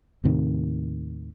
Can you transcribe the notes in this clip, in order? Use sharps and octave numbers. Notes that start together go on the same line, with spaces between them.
D#2 A2 C3 D#3